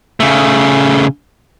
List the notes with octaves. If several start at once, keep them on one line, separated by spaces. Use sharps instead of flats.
C#3 A3